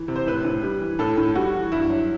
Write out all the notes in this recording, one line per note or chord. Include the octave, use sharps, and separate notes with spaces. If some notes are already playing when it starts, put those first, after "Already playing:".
Already playing: E3
C3
C5
A2 B4
A2
G3
E3
A2 A4
A2
G3 F#4
E3
G2 E4
F#3